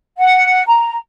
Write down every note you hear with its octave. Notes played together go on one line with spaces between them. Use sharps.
F#5
A#5